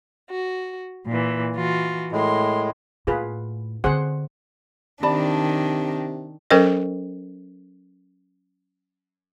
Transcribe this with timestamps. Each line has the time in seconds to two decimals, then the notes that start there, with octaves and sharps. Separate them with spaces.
0.30 F#4
1.07 A#2 E3
1.56 E3 F4 F#4
2.12 A2 G#3 A#4 C6
3.07 A2 F4 G#4 B4
3.84 D3 C4 G#4 C5 F#5
5.03 C3 D#3 D4 D5 A5 B5
6.51 F#3 C#4 A4 A#4 C5 D#5